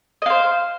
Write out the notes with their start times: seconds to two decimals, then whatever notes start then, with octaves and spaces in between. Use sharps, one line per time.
0.22 D#5
0.26 F5
0.30 C5